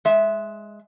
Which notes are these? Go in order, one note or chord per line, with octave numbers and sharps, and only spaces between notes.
G#3 E5